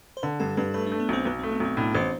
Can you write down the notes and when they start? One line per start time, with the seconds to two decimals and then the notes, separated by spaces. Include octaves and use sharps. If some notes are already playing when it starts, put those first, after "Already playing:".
0.17 C5
0.23 D3 B4
0.40 G2 A4
0.57 G2 B4
0.74 A3 B4
0.86 D4
0.92 A3
1.00 B3
1.09 B1 C4
1.25 B1 B3
1.39 C4
1.43 A3
1.51 B3
1.60 B1 C4
1.77 A2 D4
1.95 A1 C5